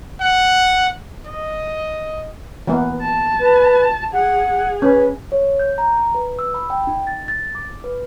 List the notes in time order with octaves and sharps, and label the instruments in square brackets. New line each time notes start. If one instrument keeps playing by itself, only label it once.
[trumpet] F#5
D#5
[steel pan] E3 A#3 B3
[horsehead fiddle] A5
[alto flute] B4
[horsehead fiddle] G#4 [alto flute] F#5
[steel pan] C#4 [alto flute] B4
[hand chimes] C#5
G6
A#5
B4
E6
B5
G5
D#4
A6
A6
D6
B4